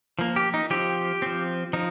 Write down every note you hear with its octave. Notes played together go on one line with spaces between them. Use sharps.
F3 A#3
G4
D#4
F3 C4 G4
F3 C4
F3 D#4